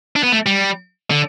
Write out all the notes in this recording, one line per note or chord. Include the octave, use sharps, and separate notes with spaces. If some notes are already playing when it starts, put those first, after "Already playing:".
D4
B3
A3
G3
D3